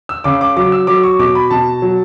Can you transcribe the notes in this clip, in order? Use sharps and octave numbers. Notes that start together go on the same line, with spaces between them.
E6
C#3 D6
D6
F#3 D6
E6
F#3 D6
C#6
B2 D6
B5
B2 A5
F#3